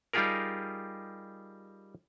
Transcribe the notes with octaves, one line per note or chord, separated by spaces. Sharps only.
G3 D#4 F4 G4 G#4 A#4